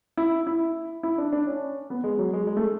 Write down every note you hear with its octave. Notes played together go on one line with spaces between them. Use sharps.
E4
E4
E4
D4
D4
C#4
B3
G#3
F#3
G#3
G#3
A3